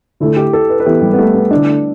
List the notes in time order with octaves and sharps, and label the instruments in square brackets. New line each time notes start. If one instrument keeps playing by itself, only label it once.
[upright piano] D3 A3 D4 [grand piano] E4
[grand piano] G4
A4
B4
B4
[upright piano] E3 B3 E4 G4 [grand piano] A4
[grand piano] G3
B3
A3
B3
[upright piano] D3 A3 E4 A4 [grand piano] D4